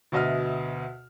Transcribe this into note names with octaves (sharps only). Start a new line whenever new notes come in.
D2 B2 D#5 E5 F6